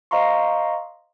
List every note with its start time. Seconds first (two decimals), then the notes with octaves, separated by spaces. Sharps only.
0.11 C5 D#5 F5 A#5 C6 C#6